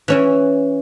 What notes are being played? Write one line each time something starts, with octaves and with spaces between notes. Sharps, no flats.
E3 C#4 E4